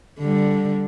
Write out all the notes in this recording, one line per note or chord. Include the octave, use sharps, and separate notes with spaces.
D3 G3